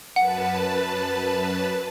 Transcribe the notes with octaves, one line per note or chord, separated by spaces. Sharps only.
F#2 B4 F#5 A5